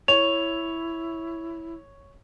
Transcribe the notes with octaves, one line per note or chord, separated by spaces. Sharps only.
E4 C#5 F7